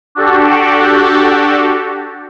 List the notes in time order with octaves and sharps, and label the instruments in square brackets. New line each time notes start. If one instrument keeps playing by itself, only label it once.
[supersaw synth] D4 F#4 G4 A4